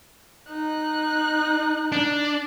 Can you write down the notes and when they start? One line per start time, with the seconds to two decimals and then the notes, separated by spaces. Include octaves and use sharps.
0.49 D#4 F#6
1.92 D4